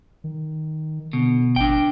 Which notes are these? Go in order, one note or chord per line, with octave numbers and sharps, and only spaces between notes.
D#3
B2 D3
G#1 D4 G5